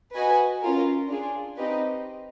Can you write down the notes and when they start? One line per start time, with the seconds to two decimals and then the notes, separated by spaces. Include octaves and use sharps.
0.15 F#4 B4 D#5 G#5
0.63 C#4 F4 A#4
1.09 D4 F4 G#4
1.57 C4 D#4 G4 B4 D#5